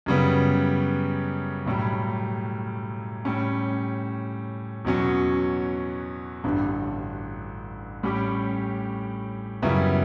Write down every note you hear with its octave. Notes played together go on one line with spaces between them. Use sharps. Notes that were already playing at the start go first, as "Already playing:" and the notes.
F#2 C#3 G3 B3
B1 A2 G3
A2 G3 C#4
E2 B2 F#3 C#4
A1 G2 D3
A2 G3 C#4 G4
F#2 C#3 G3 B3 E4